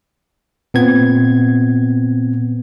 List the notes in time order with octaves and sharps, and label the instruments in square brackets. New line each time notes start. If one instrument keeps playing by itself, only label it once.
[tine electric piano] A#2 B3 C4 G#6